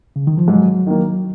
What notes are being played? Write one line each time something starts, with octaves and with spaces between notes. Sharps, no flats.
C#3
D#3
F3
G#2 F#3
D#3 A#3